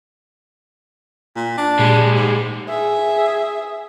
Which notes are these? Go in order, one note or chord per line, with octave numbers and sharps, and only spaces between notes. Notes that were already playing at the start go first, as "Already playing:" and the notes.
A#2
D4
A#2 G3 G#3
G#2
G#4 E5